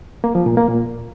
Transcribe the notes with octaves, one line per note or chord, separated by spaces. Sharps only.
A#3
F3
A#2
A#3
A#2